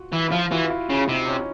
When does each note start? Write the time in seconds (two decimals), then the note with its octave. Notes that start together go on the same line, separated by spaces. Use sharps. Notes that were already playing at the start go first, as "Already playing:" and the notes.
Already playing: F4 F#4
0.13 E3
0.28 E4
0.32 F3 F4
0.51 E3 F#4
0.65 F4
0.70 E4
0.90 C#3
1.08 C3 D#4
1.28 C#4